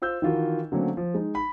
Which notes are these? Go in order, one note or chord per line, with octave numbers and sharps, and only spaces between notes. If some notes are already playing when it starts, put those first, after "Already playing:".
F4 C5 E6 G6
D#3 E3 F4 F#4 A#4
D3 F#3 A3 A#3 C4 C#4
F3
G#3 D#4
B5